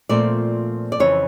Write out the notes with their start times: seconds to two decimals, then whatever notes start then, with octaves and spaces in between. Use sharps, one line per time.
0.09 A#2 F3 A3 C4 D5
0.92 D5
1.00 F2 C#3 E3 C#5